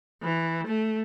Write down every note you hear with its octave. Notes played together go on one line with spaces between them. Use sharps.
E3
A3